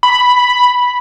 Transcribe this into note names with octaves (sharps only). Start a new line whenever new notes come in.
B5